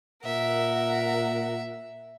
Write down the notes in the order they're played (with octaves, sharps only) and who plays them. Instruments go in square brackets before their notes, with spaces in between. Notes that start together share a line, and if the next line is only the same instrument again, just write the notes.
[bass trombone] A#2 [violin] A#4 F#5 [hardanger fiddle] E5